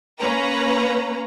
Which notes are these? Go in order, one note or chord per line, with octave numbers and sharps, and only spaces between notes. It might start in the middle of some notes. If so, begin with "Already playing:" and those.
A#3 C#4 B4 A#5